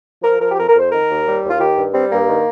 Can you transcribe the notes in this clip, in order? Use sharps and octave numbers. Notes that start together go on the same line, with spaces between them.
F3 A#4
F3 A#4
G4
F2 A#4
A#4
F2
C5
D#3 A#4
D#2
G3
D#2
F4
D#3 G4
G2
G3 C4
G2 A#3
D#3